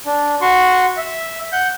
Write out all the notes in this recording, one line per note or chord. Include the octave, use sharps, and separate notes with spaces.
D4
F#4 C6 C#6
E5
F#5 G6